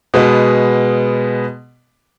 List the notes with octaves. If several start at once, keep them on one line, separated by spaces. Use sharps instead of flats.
B2 G#3 B3